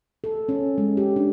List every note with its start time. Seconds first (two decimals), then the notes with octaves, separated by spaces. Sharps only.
0.24 A4
0.49 C#4
0.78 G#3
0.97 G4
1.16 D4